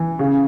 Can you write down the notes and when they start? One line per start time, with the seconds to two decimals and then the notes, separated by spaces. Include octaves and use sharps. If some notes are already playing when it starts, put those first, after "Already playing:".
Already playing: E3
0.19 C#3